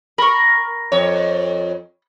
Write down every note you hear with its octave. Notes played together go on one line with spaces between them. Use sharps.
A#4 B5 C#6
F2 C#5